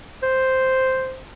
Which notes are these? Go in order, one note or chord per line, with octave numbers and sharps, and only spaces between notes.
C5